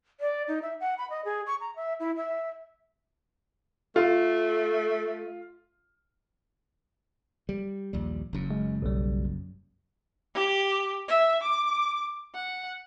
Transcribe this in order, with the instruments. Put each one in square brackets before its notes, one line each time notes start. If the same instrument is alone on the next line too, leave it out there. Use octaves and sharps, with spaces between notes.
[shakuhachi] D5
D#4
E5
F#5
B5
D#5
G#4
C#6
A#5
E5
E4
E5
[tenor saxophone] A3 [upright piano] F4
[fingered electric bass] G3
A#1 D#2 G3
F#1 F#2
[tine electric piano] G#3
B1 G3
[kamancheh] G4
E5
D6
F#5